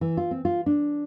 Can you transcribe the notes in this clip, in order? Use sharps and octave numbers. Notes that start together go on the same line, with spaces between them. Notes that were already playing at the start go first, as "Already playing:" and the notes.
E3
F4
C4
F4
D4